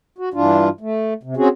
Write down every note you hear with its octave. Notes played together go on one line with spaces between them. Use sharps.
F#4
G2 E3 D4 F4
A3
C3
C4 C#4 F#4 G#4